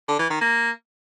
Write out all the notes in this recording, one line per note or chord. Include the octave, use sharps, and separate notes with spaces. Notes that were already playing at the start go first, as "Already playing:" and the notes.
D3
E3
D#3
A#3